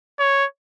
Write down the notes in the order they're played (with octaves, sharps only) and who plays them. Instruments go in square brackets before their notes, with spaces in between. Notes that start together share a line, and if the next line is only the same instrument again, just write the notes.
[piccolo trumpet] C#5